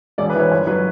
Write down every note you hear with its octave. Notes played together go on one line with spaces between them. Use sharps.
E1 D5
B4
E3 C#5
G1 C#5
F#3 B4